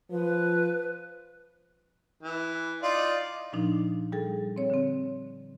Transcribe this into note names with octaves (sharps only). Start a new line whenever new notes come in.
F3 B4
E3
D#4 F4 D5
A#2 F3 D4 D#4
G3 G#4 A4
C4 C#5
D3 C4